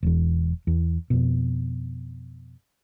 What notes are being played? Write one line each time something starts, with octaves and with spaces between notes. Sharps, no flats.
E1 E2
E2
F2 B2